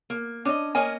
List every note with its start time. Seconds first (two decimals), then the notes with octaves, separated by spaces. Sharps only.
0.10 A#3
0.45 C#4 D4 D#5
0.75 A#3 C#4 D#5 G#5